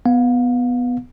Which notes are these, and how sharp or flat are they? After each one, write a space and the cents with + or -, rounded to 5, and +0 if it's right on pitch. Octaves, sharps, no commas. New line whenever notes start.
B3 +0 F5 +30